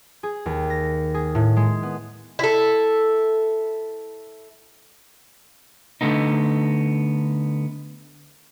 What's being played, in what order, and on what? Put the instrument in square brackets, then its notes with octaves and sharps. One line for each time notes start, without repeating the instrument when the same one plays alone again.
[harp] G#4
D#2
A#6
G#4
A2
G#3
B3
[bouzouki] E4 A4
[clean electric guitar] D3 A3 B3 D#4